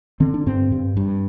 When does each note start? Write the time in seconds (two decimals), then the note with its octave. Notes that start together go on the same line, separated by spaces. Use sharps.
0.20 D3 C4
0.34 D4
0.46 G2 C4
0.72 G2
0.97 G2